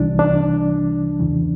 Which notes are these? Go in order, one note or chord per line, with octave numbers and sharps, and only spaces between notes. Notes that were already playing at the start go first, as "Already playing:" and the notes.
Already playing: C2 C3 E3 G3 D4
D4
E2 C#3 E3